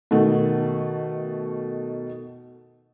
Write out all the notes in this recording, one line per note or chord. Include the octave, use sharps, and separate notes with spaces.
B2 D#3 A3